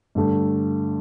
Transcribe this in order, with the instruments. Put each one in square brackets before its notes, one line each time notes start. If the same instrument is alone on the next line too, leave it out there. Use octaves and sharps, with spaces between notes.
[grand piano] G2 D3 A3